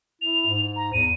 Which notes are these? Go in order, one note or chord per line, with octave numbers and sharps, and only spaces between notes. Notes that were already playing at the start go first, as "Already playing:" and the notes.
E4 F7
G#2
A#5
E2 D#7